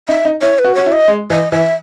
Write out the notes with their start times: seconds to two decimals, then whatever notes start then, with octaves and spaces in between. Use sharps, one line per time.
0.08 D#4 E5
0.25 D#4
0.41 E4 C#5
0.59 B4
0.64 F#4
0.75 F#4 C#5
0.86 E4
0.92 D#5
1.08 G#3
1.30 E3 D#5
1.52 E3 E5